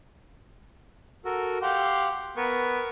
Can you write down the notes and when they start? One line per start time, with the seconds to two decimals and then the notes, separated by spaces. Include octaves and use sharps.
1.25 F#4 A4 A#4
1.62 G4 F5 F#5 C6
2.37 B3 A#4 C#6